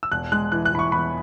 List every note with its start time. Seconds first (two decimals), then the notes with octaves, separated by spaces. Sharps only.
0.03 E6
0.12 E1 F#6
0.32 G#3 F#6
0.52 E3 F#6
0.65 F#6
0.72 E3 B5
0.79 C#6
0.92 E2 B5